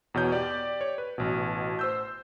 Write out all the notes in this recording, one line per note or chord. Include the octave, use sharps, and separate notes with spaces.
E2 B2 C#5 G6
G4 D5
C#5
B4
A1 B2
C5 E6 G6